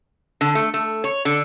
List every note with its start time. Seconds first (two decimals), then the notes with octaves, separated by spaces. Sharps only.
0.41 D3
0.55 A3
0.74 A3
1.04 C#5
1.25 D3